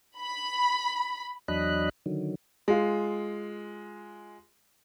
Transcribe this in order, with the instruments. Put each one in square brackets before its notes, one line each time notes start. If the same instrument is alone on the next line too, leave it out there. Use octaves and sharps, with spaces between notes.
[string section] B5
[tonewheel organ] E2 F#3 D4 D#5 B5 F#6
D3 D#3 F#3
[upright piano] G#3 F4